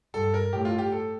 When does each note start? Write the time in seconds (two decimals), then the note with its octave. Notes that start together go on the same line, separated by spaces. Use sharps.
0.14 G2 A4
0.34 A#4
0.52 A2 G4
0.65 F4
0.78 G4
0.92 A4